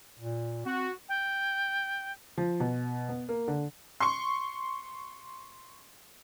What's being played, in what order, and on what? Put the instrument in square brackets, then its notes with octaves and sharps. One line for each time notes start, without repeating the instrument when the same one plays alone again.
[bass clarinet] A#2
[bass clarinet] C4 [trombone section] F#4
[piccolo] G5
[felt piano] F3
B2
B3
A#3
D3
[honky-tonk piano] C6 C#6